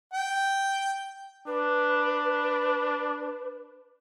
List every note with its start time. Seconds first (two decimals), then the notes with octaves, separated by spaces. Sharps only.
0.13 G5
1.47 D4 B4